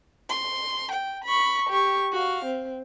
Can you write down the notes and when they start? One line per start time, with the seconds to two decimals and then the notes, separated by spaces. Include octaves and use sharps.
0.30 C6
0.92 G5
1.24 B5 C#6
1.70 G4 C#6
2.12 F#4 F5
2.45 C4